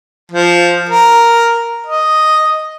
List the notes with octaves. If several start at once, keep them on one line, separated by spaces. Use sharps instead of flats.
F3
A#4
D#5